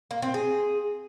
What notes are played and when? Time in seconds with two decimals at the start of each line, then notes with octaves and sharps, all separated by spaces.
0.11 A#3
0.22 C4
0.34 G#4